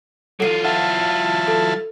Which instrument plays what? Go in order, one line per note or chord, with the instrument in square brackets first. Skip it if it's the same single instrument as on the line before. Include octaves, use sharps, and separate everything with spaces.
[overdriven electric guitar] F#3 F4 [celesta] A4 C7 D#7
[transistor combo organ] E4 F5 A5 [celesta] F#5
[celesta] A4